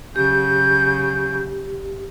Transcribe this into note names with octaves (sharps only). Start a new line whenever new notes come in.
C#3 F#3 G4 G6